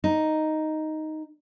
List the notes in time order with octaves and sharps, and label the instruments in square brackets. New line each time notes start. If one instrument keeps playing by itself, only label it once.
[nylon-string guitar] D#4